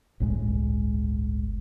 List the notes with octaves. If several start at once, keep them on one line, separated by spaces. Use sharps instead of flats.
G1 C#2 A2 G#3